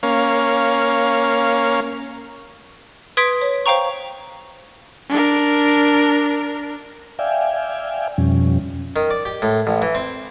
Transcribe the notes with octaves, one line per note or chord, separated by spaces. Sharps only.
A#3 C#4 F5
B4 C6 D#6 G#6 B6 D7
C#5
C5 F5 G5 A#5 C#6
D4 A#4
D5 E5 F5 G5 G#5
F2 B2 F3 G3 C#4
D#3
D5
G4
A2
A1
E3
C4